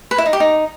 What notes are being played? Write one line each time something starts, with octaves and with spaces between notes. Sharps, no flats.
B4
E4
D#4
G4
D#4